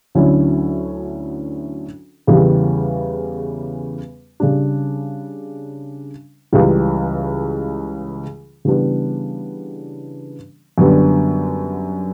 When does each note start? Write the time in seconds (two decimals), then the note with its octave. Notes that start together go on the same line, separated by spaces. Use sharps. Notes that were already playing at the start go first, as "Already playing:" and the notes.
0.15 D2 D3 F#3 C#4 E4
2.27 E2 C#3 E3 G3
4.40 C#3 G3 D4
6.53 C#2 C#3 E3 G3
8.65 C#3 E3 G3 B3 D4
10.78 F#2 D3 G3 B3